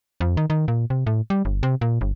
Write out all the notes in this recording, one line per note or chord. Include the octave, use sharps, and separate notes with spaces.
F2
D#3
D#3
A#2
C3
A2
G3
G1
C3
A#2
G1